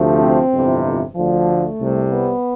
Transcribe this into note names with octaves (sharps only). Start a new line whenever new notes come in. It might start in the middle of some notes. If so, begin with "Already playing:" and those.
Already playing: D2 C3 F3 A3
C4
G1 F2 C3 E3
D2 D3 F3
A3
C2 C3 G3
B3